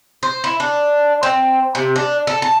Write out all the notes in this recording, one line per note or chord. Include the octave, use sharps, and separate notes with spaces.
C5
E4
D4
C4
C3
D4
A4
A5